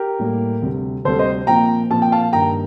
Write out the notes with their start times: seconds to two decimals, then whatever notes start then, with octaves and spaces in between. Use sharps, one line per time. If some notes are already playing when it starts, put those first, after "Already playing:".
Already playing: G4 A#4
0.19 A2 G3 A#3
0.62 D2 C3 G3
1.05 D2 C3 G3 A4 C5
1.19 C5 D#5
1.47 A#2 F3 C4 G5 A#5
1.90 A#2 F3 C4 A5
2.02 G5
2.12 F5 A5
2.33 G2 D#3 A#3 G5 A#5